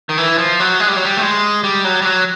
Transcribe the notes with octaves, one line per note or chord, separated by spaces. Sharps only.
D#3
E3
F3
F#3
G#3
G3
F#3
G3
A3
G#3
G3
F#3
G3
F#3